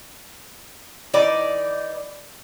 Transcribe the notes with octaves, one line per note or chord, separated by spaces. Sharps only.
E3 D#4 D5